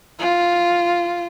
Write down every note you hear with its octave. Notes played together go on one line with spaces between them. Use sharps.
F4